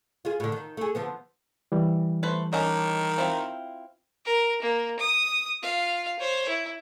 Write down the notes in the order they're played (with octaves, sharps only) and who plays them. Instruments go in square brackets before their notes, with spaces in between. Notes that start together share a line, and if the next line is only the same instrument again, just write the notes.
[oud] F4 G#4
A2 D3
D#3
A3 G#4
D3 F3 B3
[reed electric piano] E3 G3
[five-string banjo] A3 B4 C5
[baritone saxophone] D#3 [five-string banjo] C#4 D4 D#5
[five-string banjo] C4 E4 F4
[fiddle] A#4
A#3
D#6
F4 F5
C5 C#5
E4